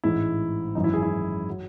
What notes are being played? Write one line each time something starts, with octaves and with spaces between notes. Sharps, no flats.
A1 G#2 E3 G#3 E4
G#1 F#2 E3 D#4
E4
G#4
E4
F#3